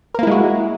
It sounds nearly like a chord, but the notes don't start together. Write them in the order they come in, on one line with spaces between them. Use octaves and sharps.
A#4 A#3 E4 G#3 F#4